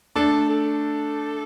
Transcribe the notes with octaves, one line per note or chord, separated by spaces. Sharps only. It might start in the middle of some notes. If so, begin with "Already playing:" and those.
A3 D4 A4
A4